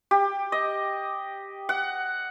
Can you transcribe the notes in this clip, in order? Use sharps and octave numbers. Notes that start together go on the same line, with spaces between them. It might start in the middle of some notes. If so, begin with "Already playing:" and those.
G4
D#5
F#5